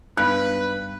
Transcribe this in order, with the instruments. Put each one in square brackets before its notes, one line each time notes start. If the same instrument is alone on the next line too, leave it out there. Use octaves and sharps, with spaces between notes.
[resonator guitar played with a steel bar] G2 [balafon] G#3 B3 D#4 [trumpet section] B4 [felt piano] F#6